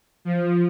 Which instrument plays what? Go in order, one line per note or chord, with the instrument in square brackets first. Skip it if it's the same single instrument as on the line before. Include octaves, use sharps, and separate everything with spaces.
[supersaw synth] F3